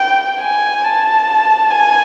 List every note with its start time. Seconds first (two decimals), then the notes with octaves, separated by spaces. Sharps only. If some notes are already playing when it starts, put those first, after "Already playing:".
Already playing: G5
0.40 G#5
0.84 A5
1.70 G#5